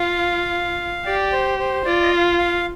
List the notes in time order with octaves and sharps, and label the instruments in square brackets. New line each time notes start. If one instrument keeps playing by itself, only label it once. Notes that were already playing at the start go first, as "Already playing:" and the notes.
Already playing: [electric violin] F4 [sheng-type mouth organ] F5
[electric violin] G4 [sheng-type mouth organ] D5
[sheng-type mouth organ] C5
C5
[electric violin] F4 [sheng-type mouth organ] D5
[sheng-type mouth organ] D#5
F5
F5